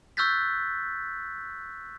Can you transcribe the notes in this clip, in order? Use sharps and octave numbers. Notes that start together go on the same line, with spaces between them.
C#6 E6 F#6 G6 A6 B6